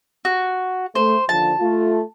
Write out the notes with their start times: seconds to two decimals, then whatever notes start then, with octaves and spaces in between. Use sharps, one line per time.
0.25 F#4
0.95 A3 C5
1.29 D#2 D3 F3 A5
1.60 A3 F4